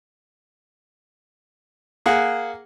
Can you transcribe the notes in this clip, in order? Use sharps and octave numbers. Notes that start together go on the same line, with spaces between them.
A#3 G#4 F#5